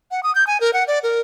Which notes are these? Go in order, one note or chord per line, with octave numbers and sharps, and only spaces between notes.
F#5
D#6
G6
G#5
A#4
F#5
D5
A#4